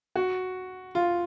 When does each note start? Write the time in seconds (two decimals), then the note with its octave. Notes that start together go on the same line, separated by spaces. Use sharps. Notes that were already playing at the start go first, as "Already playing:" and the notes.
0.16 F#4
0.95 F4